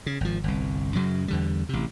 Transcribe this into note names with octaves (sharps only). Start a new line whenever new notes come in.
C#3
G#1 F3
G1 C2
F#2 C#3 F#3
E2 D3 G3
A1 C3